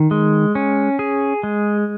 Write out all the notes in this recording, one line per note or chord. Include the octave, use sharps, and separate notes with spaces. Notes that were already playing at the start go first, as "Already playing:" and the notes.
Already playing: D#3
G#3
C#4
G#4
G#3